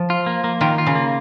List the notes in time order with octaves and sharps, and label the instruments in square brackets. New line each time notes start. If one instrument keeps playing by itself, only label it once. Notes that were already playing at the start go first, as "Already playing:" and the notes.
Already playing: [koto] F3
[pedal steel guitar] F4
A#3
A#3
[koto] D#3 [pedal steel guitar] F4
[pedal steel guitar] F4
[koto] C#3
[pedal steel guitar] A#3